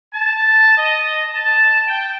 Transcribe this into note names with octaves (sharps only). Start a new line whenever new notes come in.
A5
D#5
A5
G5